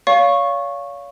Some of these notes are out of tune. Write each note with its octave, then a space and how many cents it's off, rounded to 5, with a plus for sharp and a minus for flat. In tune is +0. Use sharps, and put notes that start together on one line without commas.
C#5 +35 F5 +0 C#6 -10